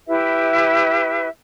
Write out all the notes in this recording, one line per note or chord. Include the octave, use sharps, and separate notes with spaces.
E4 G4 B4 E5